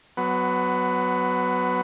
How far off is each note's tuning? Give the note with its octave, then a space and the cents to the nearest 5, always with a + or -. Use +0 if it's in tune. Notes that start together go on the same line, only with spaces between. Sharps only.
F#3 +0 B3 +15